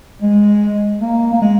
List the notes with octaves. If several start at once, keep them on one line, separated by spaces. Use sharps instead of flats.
G#3
A#3
A#3
G#3